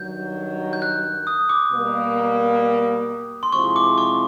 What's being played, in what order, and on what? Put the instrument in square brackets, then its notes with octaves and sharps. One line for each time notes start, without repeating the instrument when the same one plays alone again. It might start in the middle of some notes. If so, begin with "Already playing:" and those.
Already playing: [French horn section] G2 D#3 F#3 [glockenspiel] G6
[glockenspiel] G6
F#6
D#6
D6
[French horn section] B2 G3 A#3
[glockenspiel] C6
[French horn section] C3 F3 G#3 C4 E4 [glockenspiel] C#6
[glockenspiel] D6
C#6